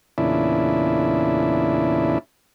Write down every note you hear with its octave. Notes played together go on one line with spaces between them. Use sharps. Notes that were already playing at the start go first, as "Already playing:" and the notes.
E2 A#2 C#3 D4 E4